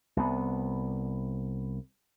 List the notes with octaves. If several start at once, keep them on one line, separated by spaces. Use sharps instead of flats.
C2 B3